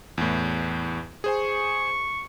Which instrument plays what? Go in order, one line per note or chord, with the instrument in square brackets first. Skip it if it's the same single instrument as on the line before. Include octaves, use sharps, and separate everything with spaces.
[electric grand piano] E2 A2
[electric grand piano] G#4 C5 G#5 [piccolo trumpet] C#6